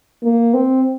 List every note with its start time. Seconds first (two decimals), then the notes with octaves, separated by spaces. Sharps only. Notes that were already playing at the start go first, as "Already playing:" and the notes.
0.24 A#3
0.54 C4